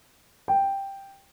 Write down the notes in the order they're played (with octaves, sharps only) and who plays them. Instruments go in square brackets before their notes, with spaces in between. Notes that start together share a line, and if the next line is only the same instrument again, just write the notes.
[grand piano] G5